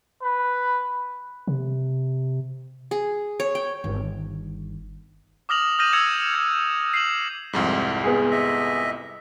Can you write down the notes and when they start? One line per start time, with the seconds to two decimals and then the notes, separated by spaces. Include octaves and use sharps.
0.23 B4
1.47 C3
2.91 G#4
3.40 C#5
3.55 G5
3.84 G1 D#3
5.49 D6 D#6 F6 A#6 F7 F#7
5.79 D#6 F6 G6 A#6 D#7 E7
5.93 E6 G#6 A#6 C#7 F7 F#7
6.34 G#6 C#7
6.94 C7 D#7 E7 F#7
7.53 C2 F2 G#2
8.04 B3 G#4
8.31 D#5 E5